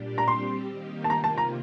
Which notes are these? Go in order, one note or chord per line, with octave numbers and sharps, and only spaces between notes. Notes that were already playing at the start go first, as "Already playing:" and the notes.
Already playing: A#2 G3 D4 G4
A#5
G3 C4 G4 C6
D#3 A#3 D#4 G4
A5
C3 D#3 A#3 F4 A#5
A5
A#5